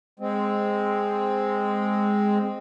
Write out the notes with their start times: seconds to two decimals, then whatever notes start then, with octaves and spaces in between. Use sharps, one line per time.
0.20 G#3 C4